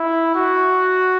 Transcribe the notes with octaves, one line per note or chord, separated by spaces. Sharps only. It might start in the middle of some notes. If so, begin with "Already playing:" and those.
Already playing: E4
F#4